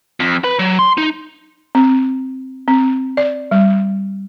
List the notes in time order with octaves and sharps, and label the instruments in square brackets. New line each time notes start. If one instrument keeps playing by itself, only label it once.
[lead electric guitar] F2
B4
F#3
C6
D#4
[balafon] C4
C4
D5
G3